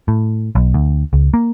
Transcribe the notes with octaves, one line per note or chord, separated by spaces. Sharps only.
A2
B1
D2
C#2
A#3